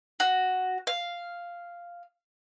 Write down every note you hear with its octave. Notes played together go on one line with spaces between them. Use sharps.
F#4
F5